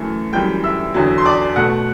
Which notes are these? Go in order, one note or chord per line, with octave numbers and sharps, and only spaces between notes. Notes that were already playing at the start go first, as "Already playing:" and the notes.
Already playing: F#2 E3 A3
F#2 E3 G3 G5 G6
E5 E6
E2 D3 F#3
C6
D5 D6
B2 A3 F#5 F#6